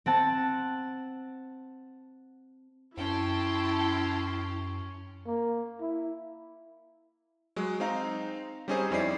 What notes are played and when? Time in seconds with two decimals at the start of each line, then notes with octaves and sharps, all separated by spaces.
0.06 C4 F#5 A5
2.98 F#2 C#4 E4 G5 A5 C6
5.26 A#3
5.81 E4
7.56 F#3 G#3
7.80 C4 D#4 F5 A#5
8.68 G3 C4 C#4 D#4 G#4 C5
8.91 F2 C#4 E4 D5 C7